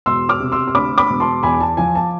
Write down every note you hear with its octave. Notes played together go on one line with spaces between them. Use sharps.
E1 C6 E6
D6 F6
C3
C6 E6
E6
D2 B5 D6
B5 D6
E1
A5 C6
E2 G#5 B5
A5
F3 G#5
A5